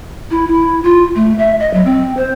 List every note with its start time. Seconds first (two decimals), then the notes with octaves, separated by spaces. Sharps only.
0.31 E4
0.47 E4
0.83 F4
1.15 A3
1.38 E5
1.59 D#5
1.74 F#3
1.85 C4
2.17 C5